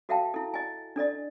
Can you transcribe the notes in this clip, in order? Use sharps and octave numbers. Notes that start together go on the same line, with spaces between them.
F#4 A4 E5 F5 G5 A5
E4 A4
D#5 G#5
D4 A4 D5 D#5